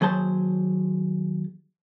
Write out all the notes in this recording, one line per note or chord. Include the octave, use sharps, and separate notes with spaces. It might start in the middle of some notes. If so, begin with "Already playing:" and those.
D#2 F#3 G#4 C5 A5